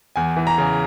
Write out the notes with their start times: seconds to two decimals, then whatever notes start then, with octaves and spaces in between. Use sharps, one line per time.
0.16 E2 G#5
0.36 E3
0.47 A#5
0.58 C#3